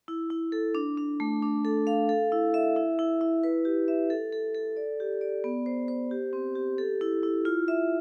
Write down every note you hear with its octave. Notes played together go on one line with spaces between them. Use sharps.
E4
E4
A4
D4
D4
A3
D4
A4
F5
A4
E4
E5
E4
E4
E4
B4
G4
E5
A4
A4
A4
D5
G4
D5
B3
C5
C5
G4
C4
G4
A4
E4
E4
F4
E5